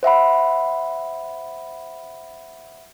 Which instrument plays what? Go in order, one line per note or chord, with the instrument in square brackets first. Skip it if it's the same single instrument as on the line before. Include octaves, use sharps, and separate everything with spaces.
[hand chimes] C5 E5 F#5 B5